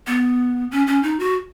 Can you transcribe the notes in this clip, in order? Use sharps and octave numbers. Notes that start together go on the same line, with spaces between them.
B3
C#4
C#4
D#4
F#4